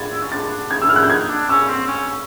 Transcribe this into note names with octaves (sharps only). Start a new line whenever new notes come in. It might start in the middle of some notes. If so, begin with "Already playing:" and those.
Already playing: G#6 A6
E4
C#4
D4 A6
D4
D#4 G#6
E6
E4 F6
F#6
G6
D#4 G#6
D4
C#4 E6
C4
C#4